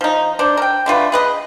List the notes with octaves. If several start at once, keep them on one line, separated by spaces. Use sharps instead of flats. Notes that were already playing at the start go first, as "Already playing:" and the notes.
F3 D#4
D4 C5
A#4 G5
D3 A3 F4 B4
G#4 B4 D#5